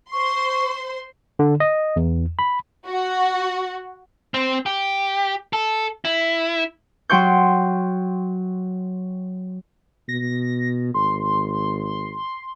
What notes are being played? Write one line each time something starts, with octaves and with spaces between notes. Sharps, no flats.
C5 C6 C#6
D3
D#5
E2
B5
F#4
C4
G4
A4
E4
F#3 G5 C6 C#6 G6
B2 A#6
G#1 C6